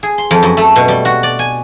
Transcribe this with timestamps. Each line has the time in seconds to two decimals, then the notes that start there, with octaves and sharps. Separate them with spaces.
0.03 G#4
0.18 C6
0.31 F2
0.43 F#2
0.57 A3
0.76 B2
0.88 G3
1.05 F#4
1.23 D5
1.39 G#5